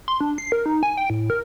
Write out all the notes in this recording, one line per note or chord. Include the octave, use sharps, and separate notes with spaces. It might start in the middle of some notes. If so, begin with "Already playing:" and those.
C6
D4
C7
A#4
D#4
G#5
G5
A2
A#4